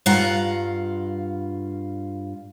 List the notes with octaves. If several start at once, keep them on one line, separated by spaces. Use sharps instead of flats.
G2 F4 F5 F#5 A#5